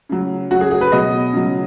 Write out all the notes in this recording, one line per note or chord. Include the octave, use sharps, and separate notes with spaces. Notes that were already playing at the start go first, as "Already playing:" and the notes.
C#3 F#3
C#3 F#3 F#4
G#4
G#4
B4
B2 F#3 D#5
C#3 F#3